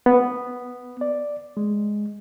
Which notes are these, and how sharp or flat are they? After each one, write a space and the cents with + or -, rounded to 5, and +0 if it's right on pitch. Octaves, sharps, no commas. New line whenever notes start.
B3 +0
D5 +0
G#3 +5